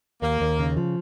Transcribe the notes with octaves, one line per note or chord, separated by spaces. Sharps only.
D#2 A#3
D#2
C#3
F3